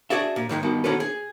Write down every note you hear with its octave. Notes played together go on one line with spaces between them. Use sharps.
D4 F#4 G#4 D5 E5
A#2
G#2 D#3 E3 G#3
G2 B2 D#3
B2 D3 D#3 C#4 A4 B4
G#4